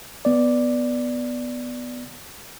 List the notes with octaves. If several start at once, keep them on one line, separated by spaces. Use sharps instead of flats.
B3 D5